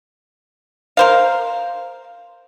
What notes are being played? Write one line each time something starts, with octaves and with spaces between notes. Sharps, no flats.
A#4 C5 F5